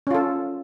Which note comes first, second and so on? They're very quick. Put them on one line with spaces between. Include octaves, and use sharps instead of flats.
C#4 F4 A4